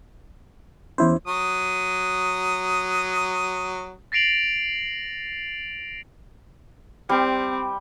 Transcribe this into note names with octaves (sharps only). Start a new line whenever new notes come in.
E2 C#4 E4 C5
F#3 D#6
A6 A#6 C7 D7 F7 F#7
G3 C4